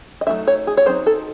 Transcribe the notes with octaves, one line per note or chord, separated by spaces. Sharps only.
D#5
F#3 A3 C4 D#4 E5
C#5
G#4
C#5
F#3 C4 D#4 C5
A4